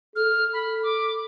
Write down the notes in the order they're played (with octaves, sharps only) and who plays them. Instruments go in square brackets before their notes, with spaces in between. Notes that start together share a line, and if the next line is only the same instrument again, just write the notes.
[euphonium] A4 [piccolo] F6
[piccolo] B5
D6